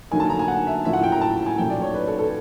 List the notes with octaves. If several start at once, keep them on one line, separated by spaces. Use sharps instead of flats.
D3 F#3 A#3 D#4 G#5
A5
A#5
G#5
F#5
E5
A2 F#3 A#3 C#4 F4 E5
F#5
G5
A#5
A5
G#5
A#2 F#3 A3 C#4 G5
D5
C#5
B4
A4
A4